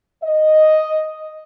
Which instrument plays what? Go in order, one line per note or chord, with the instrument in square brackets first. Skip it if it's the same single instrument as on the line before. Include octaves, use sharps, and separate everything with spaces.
[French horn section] D#5